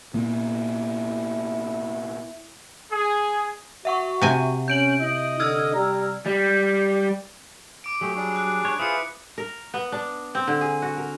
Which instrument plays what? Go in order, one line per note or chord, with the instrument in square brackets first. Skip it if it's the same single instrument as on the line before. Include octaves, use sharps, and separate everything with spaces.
[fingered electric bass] A#2 A#3 B3 [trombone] E4
[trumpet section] G#4
[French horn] F#4 [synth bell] E5 F#5 C#6
[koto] C3 G#5
[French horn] C#4 [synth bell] G6 D7 F#7
[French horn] E4 [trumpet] D#5
[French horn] D3 [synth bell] E6 F6 G#6
[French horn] G3 [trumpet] A#5
[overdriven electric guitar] G3
[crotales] D6 D7
[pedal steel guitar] F#3 [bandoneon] A3 G4 G#4
[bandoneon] G3 D4 G#4
[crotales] F#6
[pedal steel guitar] C#5
[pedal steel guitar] E4 B4 [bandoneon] F4 G#4 C5 [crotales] D#6 C#7
[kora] A#4
B3
D4
C4
D3
G#4
F#4
A#4